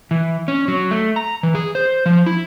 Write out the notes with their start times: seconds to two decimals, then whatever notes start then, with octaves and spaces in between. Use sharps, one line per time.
0.11 E3
0.48 C#4
0.68 F#3
0.91 A3
1.16 A#5
1.43 E3
1.55 G#4
1.75 C5
2.06 F3
2.26 E4